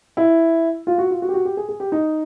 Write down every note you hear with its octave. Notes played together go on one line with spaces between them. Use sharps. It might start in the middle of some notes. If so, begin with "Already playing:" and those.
E4
F4
F#4
F4
F#4
G4
F#4
G4
G#4
G#4
G4
D#4